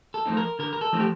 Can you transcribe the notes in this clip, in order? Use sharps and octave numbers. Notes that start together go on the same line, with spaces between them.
A4
F3 A3 C4 D#4
A#4
D3 A#4
A#4
A4
F3 A3 C4 D#4
G4